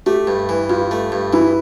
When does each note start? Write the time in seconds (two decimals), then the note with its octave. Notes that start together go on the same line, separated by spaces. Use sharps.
0.06 A3 G4
0.27 G2
0.49 E3
0.69 G2 F4
0.91 A3
1.12 G2
1.33 E3 E4